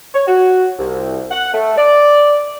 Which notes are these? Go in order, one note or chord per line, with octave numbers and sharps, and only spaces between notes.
C#5
F#4
C2
F#5
A3
D5